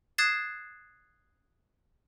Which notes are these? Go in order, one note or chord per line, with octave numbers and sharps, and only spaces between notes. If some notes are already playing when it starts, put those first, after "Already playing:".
D#6 F#6 G#6 A6 C7 E7